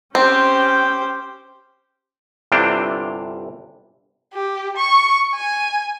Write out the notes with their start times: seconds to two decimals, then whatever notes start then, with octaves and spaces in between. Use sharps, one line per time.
0.15 C4 C#4 G4 C5 G5
2.52 G1 C3 E3 D4 F5 G5
4.34 G4
4.77 C#6
5.35 G#5